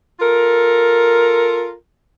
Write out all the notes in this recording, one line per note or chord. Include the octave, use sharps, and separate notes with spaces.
F4 A4 A#4